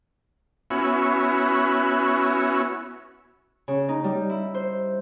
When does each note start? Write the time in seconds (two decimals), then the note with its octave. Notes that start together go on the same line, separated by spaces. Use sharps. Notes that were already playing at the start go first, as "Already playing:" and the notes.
0.70 B3 C#4 E4 F#4
3.68 C#3
3.89 D#4
4.04 G3
4.30 E4
4.54 C5